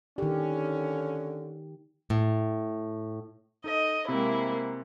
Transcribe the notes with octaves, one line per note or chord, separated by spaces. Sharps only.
D3 D#3 C#4 G4
A2
D#4 A4 D#5
C3 G#3 A#3 C4 E4